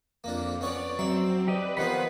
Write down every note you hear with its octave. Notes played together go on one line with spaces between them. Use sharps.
F2 A#3 D4
B3 C#4 C#5 D5
F#3 C4 E5
G4 B4 D5 D#5
D#3 F3 B3 C5 F#5 B5